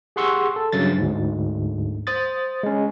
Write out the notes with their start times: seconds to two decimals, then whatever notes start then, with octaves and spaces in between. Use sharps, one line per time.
0.16 G4 G#4 F#5 C6 C#6 E6
0.56 A4
0.72 G2 C#3 F#3 A6
0.98 D2 G#2
2.07 C5 D#6 A6
2.63 G#3 C#4